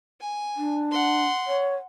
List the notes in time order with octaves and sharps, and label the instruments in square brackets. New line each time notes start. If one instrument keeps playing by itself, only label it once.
[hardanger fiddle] G#5
[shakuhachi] D4
[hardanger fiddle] F#5 C6
[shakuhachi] C#5